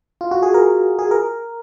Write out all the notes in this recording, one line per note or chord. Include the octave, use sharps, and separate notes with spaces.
F4
F#4
G#4
A#4
G#4
A#4